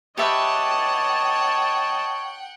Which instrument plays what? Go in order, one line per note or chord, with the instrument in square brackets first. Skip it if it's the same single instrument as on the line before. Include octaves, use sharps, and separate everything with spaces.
[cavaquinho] G4 B4 E5 [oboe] C#5 [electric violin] D#5 A5 [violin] F#5 G5